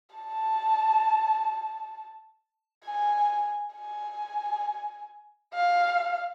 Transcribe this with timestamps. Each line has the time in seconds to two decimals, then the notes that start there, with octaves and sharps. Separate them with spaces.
0.16 A5
2.85 G#5
3.75 G#5
5.54 F5